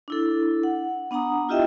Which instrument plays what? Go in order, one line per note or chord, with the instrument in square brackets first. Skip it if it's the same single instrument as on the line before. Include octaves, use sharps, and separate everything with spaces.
[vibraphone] D4 E4 A4
F#5
B3 D4 F#5 A#5 D#6
E4 F4 G4 D#5 E5 G5